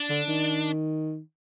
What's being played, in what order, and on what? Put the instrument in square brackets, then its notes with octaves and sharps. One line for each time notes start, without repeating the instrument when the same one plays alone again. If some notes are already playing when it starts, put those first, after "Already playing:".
Already playing: [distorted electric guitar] D4
[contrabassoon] D3
D#3